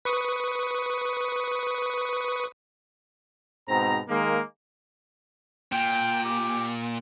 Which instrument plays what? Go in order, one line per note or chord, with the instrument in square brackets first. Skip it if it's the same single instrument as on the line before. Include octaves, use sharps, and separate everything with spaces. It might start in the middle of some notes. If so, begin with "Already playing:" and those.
[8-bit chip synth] B4 C#6 D#6
[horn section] G#2 B2 C4 A#5
D#3 G#3 A#3
[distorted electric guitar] A#2 [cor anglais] G5
[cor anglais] G4